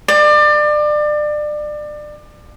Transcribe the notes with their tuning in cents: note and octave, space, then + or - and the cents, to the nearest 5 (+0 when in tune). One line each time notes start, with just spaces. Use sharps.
D5 +30